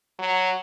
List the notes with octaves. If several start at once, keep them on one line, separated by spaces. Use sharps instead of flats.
F#3